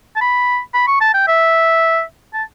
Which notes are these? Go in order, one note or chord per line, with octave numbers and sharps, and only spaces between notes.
A5
B5
B5
C#6
A5
G5
E5
A5